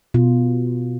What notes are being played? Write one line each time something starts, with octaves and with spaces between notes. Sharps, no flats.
B2 F4